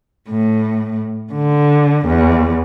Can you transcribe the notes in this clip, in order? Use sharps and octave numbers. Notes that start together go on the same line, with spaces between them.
A2
D3
E2